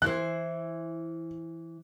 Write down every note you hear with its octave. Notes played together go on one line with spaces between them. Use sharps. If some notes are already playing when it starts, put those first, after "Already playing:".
E3 E4 C5 F#6